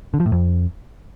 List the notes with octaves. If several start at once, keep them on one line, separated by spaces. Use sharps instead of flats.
D3
F3
A2
F2